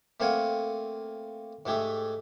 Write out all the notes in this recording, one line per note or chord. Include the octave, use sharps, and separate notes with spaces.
A3 A#3 C4 F5 F#5 G#5
G#2 A3 G4 G#4 E5